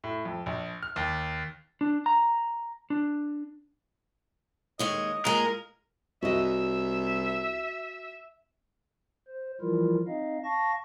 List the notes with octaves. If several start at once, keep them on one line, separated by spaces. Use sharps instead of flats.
A2
F2
A#1
F6
D#2
D4
A#5
D4
D#2 G#3 C#5 D#5
A#2 G#3 A#4
C2 F#4 D#5 E5
C5
E3 F3 G3 E4 F4 A#4
C4 D#4 D#5 F5
F5 A5 C#6 A#6